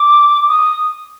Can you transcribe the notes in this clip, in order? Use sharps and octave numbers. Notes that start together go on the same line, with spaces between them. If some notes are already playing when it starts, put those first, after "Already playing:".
Already playing: D6
D#6